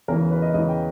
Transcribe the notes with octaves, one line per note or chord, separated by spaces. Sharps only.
E2 C#3 E3 A#4
B4
D#5
E2 C#3 E3 D#5
G5